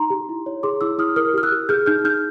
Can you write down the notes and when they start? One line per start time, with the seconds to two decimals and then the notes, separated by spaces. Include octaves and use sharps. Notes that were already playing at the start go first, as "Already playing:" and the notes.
Already playing: D#4 A#5 C6
0.10 G4
0.29 E4
0.46 C#5
0.63 G#4 C6 D6
0.81 E4 D6 E6
0.98 E4 D#6 F6
1.16 A#4 D#6 F6
1.34 G4 F6
1.43 E6 F#6
1.52 G4
1.69 G#4 F6 G6
1.86 D#4 F6 G6
2.04 D#4 F6 G6